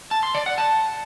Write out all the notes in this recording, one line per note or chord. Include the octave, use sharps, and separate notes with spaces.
A5
C6
D5
F#5
A5